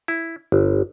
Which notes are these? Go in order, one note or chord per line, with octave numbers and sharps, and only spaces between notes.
E4
G1